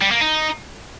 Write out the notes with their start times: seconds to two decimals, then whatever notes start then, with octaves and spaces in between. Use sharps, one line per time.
0.02 G3
0.12 A#3
0.21 D#4